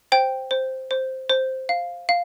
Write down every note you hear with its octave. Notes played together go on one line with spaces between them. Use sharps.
C5 G5
C5
C5
C5
F5
F5